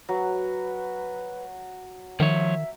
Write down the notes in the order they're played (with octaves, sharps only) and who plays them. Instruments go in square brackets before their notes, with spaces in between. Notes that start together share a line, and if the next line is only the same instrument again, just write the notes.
[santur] F#3 [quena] B4
[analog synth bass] D#3 [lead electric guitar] F3 C#5 [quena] E5